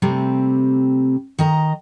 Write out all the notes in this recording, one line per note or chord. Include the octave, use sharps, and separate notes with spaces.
C3 G3 A3 C4
D#3 D#5 A#5